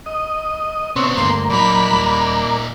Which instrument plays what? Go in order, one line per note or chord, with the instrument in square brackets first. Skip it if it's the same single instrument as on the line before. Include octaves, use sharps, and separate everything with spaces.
[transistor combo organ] D#5
[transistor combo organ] C3 C4 C#5 [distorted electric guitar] B3 D4
[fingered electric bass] D2 G2 [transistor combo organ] A#3 [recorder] C6
[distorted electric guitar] A#2 D#4 [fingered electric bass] F#3 [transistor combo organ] A#3 D5 [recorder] B5
[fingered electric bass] D#2 G3